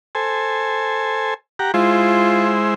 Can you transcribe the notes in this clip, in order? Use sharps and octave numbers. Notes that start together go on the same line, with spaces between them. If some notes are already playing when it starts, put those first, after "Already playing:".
A4 C5 G#5
G4 F#5 A#5
G#3 E4 F4 C5